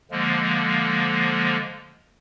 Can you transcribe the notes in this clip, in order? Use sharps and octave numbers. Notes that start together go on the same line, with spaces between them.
D3 F3 G#3 A#3